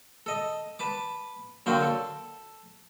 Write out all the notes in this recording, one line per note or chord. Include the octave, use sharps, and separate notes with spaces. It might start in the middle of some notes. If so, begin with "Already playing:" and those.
A4 D#5
B4 A5 D6
D3 F#3 A#3 F#4 C5 G5
A4